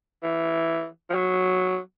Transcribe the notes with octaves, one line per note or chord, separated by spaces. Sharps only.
E3
F3
F#3